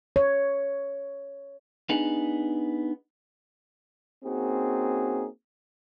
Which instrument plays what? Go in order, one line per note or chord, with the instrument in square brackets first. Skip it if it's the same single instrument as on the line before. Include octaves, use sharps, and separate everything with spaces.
[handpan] C#5
[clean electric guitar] B3 D4 D#4 G#4
[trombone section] A#3 C4 C#4 D#4 F#4 G#4